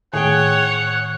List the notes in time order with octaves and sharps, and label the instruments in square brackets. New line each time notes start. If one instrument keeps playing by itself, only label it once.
[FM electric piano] A2 D#3 [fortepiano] G#4 G5 [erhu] C#5 [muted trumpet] F#5